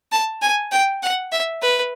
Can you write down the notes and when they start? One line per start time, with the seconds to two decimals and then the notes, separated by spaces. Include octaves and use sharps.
0.12 A5
0.42 G#5
0.71 G5
1.02 F#5
1.32 E5
1.62 B4